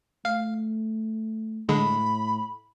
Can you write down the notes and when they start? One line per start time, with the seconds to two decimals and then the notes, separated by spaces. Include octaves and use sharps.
0.25 A3 F5
1.69 A2 D3 G#3 B5